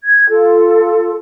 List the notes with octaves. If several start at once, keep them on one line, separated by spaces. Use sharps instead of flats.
G#6
F4 A4